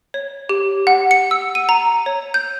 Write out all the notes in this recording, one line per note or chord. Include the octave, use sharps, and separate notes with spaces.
C#5
G4
F#5
C#7
E6
D#7
A#5
C#5
G6